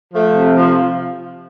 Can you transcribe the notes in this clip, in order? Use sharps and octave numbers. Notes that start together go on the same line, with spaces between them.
F3 A3
C3
F3